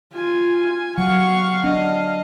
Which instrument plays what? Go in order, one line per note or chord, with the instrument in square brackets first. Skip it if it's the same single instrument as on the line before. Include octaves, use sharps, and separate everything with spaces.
[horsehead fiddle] F4 [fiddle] G#5
[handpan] F#3 [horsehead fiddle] F5 [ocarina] F#5 [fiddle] C#6
[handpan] D4 [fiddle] D#5